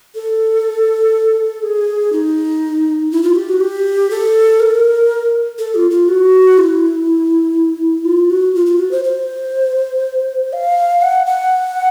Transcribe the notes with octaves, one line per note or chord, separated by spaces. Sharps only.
A4
G#4
D#4
E4
F4
G4
F#4
G4
A4
A#4
A4
F4
F4
F#4
E4
F4
F#4
F4
F4
F#4
C5
C5
F5
F#5
F#5